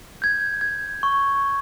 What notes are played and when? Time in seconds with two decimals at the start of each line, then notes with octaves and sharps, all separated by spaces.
0.22 G6 G#6
0.61 G#6
1.03 C#6